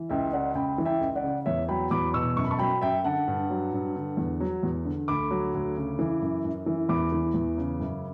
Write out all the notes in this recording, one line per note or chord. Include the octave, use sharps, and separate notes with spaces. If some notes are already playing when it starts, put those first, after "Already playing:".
Already playing: E3
C#2 E5 G5
C#3 D5 F#5
C#2 G5 B5
E3
E5 G5
C#2
D5 F#5
C#3
E2 C#5 E5
F#3 G5 B5
E2 B5 D6
B2 C#6 E6
F#2 C#6
B5
A5 C#6
F#3 G5 B5
F#2 E5 G5
D3 F#5 A5
G2
F#3
G2
D3
E2
F#3
E2
D3
D2 B5 D6
F#3
D2
C#3
E3
F#2
F#2
E3
E2 B5 D6
E3
E2
C#3
F#2